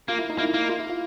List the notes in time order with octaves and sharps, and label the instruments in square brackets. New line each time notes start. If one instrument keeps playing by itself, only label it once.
[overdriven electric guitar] A#3 [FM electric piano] F4
[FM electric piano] E4
D#4
[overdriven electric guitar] A#3 [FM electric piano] E4
[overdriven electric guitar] A#3
[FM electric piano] F4
E4
F4